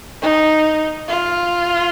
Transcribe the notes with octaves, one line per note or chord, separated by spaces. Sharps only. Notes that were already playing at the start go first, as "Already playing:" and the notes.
D#4
F4